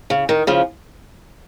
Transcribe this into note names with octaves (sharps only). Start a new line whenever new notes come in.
C#3
D#3
C#3 F3